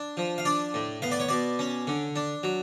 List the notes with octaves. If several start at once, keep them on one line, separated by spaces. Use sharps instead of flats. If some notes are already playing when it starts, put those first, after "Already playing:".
Already playing: D4
F3
F5
D4 D5
A2
B3 F5
D5
C#5
B2 D5
C#4
D3
D4
F#3